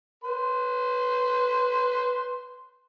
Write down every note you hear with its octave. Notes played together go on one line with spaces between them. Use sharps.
B4 C6